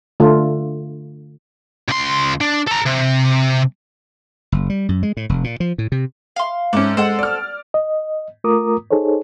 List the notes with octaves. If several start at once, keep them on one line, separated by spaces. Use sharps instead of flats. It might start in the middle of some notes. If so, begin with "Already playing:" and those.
D3 A3 F4
C#2 C6
D4
A4 A#5
C3
F#1
G3
F#2
G#3
A2
F1
A#2
F3
A2
C3
F5 C6
G#2 A3 C#4 D6 G6
G#3 A4 C5 F#5
D5 F6
D#5
A3 F4 A#4 A#5 D6 D#6
D#4 G#4 A4 C5 C#5